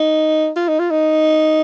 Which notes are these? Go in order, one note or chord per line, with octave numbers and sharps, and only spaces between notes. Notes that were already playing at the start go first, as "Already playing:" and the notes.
Already playing: D#4
F4
D#4
F4
D#4